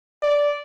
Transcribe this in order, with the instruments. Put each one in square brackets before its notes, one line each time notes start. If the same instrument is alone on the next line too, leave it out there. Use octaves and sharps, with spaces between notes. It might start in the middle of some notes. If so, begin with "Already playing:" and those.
[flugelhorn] D5